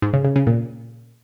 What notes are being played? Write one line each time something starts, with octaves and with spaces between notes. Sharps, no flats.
G#2
C#3
C#3
C#3
A#2